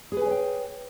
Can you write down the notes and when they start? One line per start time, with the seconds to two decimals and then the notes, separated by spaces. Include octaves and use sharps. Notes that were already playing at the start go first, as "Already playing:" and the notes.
0.12 G#4
0.17 B4
0.21 G#5
0.26 C#5
0.31 G5